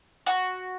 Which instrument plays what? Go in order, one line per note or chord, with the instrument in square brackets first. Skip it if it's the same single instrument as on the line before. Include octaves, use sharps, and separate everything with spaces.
[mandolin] F#4